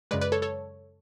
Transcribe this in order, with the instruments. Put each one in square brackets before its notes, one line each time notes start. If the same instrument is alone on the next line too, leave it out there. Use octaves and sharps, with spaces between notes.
[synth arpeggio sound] F#2 C#3 G#3 B4 D5
B4 D5
A4 C#5
A4 C#5